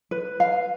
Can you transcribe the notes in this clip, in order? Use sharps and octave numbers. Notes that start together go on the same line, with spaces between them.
B4
F5